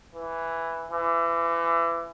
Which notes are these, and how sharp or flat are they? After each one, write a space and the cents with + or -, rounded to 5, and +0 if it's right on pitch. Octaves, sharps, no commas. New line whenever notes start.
E3 +5
E3 +30